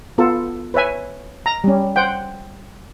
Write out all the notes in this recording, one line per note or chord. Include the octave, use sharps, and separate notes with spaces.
B3 F4 A4
B4 C#5 E5 G#5
A#5
G3 C#4
C5 F#5 G5